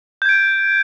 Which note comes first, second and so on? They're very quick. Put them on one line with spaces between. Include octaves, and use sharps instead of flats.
G6 G#6 D7